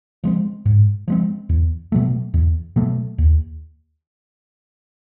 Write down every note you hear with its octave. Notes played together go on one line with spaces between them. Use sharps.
F3 G#3 C4
G#2
F3 G#3 C4
E2
B2 F#3 A3
E2
B2 F#3 A3
D#2